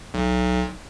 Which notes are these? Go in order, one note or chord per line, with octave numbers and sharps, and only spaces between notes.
B1